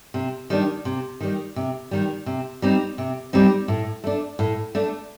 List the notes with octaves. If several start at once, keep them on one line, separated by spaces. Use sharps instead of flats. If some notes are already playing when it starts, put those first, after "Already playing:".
C3
D#3 G3 D4
C3
D#3 G3
C3
D#3 G3
C3
G3 C4 D#4
C3
G3 C4 D#4
A2
A3 D4
A2
A3 D4